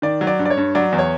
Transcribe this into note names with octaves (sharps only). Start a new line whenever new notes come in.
D#3 D5
F#3
D5
G2
D5
C#5
G2
F#3 D5
E2
C#5